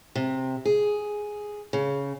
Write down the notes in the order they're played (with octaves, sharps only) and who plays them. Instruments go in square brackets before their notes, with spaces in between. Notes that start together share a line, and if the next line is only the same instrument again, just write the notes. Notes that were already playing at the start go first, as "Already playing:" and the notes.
[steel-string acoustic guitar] C3
G#4
C#3